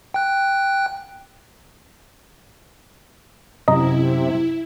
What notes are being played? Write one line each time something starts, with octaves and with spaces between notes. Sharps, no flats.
G5 F#6
F#2 C3 E4 D#5 A#5